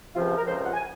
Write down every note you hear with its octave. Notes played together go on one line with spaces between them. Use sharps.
C#2 C3 F3 F4
F4
A#4
C#2 C3 F3 C5
F#5
G#5